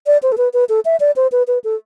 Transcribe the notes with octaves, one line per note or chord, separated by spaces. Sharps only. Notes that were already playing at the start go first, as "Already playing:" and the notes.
D5
C5
A4
B4
B4
A4
E5
D5
C5
B4
B4
A4